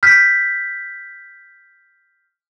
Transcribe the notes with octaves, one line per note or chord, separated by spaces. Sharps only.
F6 G6 B6